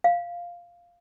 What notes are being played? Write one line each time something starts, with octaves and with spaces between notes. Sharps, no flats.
F5